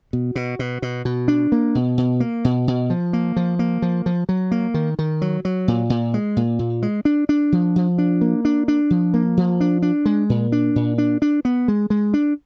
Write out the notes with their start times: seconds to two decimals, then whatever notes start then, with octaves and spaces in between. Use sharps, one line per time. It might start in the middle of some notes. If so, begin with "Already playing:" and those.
0.13 B2
0.36 B2
0.59 B2
0.82 B2
1.05 B2
1.28 D4
1.52 A#3
1.75 B2
1.98 B2
2.20 A#3
2.45 B2
2.68 B2
2.90 F3
3.13 A#3
3.36 F3
3.59 A#3
3.82 F3
4.06 F3
4.29 F#3
4.51 A#3
4.74 D#3
4.99 D#3
5.22 F#3
5.45 F#3
5.68 A#2
5.90 A#2
6.14 G#3
6.37 A#2
6.59 A#2
6.82 G#3
7.05 D4
7.29 D4
7.52 F3
7.76 F3
7.98 D4
8.21 A#3
8.45 D4
8.68 D4
8.90 F3
9.14 A#3
9.37 F3
9.61 D4
9.82 D4
10.06 G#3
10.30 A#2
10.52 D4
10.76 A#2
10.98 D4
11.22 D4
11.45 B3
11.68 G#3
11.90 G#3
12.14 D4